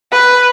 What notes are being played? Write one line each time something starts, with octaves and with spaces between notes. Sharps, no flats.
B4